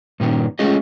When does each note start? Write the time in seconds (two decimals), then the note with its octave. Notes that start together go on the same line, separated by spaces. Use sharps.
0.20 G2 A#2 D#3 A#3 C#4
0.59 G#3 A3 C#4 F4 G#4 D#5